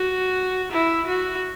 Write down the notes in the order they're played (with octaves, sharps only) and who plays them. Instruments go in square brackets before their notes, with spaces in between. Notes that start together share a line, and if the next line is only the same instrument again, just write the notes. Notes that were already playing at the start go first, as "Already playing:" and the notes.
Already playing: [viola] F#4
E4
F#4